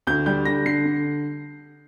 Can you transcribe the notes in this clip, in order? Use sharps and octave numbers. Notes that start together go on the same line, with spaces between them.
D2 G6
G3 G6
D3 A#6
D3 C7
D3